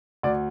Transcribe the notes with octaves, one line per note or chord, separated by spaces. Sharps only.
D2 D5